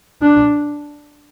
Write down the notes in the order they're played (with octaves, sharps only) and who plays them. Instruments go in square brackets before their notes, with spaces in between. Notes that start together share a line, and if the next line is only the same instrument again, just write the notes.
[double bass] D4